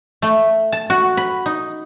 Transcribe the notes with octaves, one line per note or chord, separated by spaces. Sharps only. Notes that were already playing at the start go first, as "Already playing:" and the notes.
A3
A5
F#4
B5
D#4